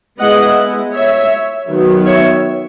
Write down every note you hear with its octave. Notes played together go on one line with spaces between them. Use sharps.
G#3 B3 E4 D#5 F#5
C#5 E5
D#3 F#3 B3
C#5 E5